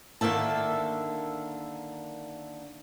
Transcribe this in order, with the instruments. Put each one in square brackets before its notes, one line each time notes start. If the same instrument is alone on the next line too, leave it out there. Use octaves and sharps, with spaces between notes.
[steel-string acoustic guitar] D3 D#3 A#3 E5 A5